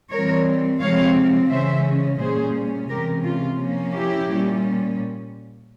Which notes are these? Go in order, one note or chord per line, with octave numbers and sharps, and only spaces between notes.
E3 G3 C4 A#4 C#5
C3 F3 G#3 C4 C#5 F5
C#3 E3 G#3 C#4 C5 E5
A#2 G3 C#4 G#4 C5
C3 E3 G#3 C#4 G4 A#4
F4
F3 A#3 C#4
E4 G4
A#2 G3 C#4